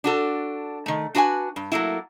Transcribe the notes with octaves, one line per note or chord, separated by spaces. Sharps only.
D4 F#4 A4
D#3 A3
D4 F#4 B4 F#5 G#5
G2
F#3 A3 A#3 E4